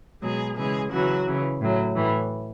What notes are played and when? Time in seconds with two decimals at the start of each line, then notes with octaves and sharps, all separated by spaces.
0.22 B2 F#3 G#3 G#4
0.56 C#3 E3 G#3 G#4
0.91 C#3 E3 F#3 F#4
1.26 C#3 E3
1.60 A2 F#3
1.95 A2 E3